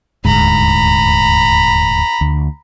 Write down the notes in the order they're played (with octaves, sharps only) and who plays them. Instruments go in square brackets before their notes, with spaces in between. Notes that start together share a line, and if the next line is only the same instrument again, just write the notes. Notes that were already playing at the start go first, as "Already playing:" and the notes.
[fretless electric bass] D#1 D2 G#2 [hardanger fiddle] A#5 B5
[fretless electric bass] D2